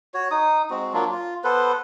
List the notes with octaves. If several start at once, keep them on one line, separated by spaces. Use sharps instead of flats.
F#4 C#5
D#4 D#6
G#3 C4 F#4
F#3 A#3 D4 F4
F4
B3 A4 B4 C5